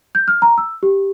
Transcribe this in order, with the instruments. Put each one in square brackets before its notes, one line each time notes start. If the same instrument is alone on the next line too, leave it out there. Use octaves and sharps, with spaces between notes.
[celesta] G6
F6
A#5
E6
G4